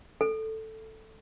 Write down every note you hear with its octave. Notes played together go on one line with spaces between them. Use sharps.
A4